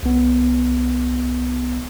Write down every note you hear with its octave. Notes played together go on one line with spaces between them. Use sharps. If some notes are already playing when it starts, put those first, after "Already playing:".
C2 B3